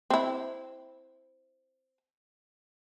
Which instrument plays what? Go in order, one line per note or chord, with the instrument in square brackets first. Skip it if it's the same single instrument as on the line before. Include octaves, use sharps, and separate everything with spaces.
[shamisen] C4 E4